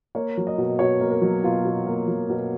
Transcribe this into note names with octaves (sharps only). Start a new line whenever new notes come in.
A#3 C#5
F#3
D#5
B2
B2 C#5
A#3
A#4
F#3
B2 F4
B2
A#3
F#3
B2